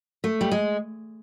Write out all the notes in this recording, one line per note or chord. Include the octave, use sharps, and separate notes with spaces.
A3
G3
G#3